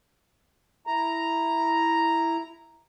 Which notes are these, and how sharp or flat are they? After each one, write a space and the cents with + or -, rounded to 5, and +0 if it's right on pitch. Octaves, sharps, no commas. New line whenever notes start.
E4 +0 A#5 +0